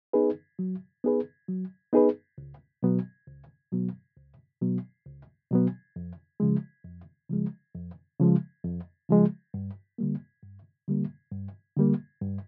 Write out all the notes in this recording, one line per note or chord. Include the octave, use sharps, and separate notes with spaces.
B3 D#4 G#4 B4
F#3
B3 D#4 G#4 B4
F#3
B3 D#4 G#4 B4
C#2
B2 F#3 B3
C#2
B2 F#3 B3
C#2
B2 F#3 B3
C#2
B2 F#3 B3
F2
C#3 F3 G#3
F2
C#3 F3 G#3
F2
C#3 F3 G#3
F2
C#3 F3 G#3
G2
D3 G3 A#3
G2
D3 G3 A#3
G2
D3 G3 A#3
G2